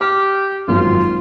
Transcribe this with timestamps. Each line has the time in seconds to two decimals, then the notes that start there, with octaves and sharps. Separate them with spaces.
0.01 G4 F6
0.68 G#1 F#2 F3 F4